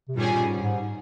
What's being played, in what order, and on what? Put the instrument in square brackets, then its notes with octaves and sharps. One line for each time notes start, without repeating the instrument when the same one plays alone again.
[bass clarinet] C3
[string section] G2 D#3 G3 C#4 G#4 [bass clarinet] A#2
[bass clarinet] A#2
G#2
G#2